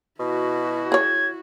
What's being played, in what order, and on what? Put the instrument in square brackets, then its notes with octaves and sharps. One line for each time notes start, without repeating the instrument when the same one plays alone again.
[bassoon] B2 [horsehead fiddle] E4 F#4
[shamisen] G#4 C#5 [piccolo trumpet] G#6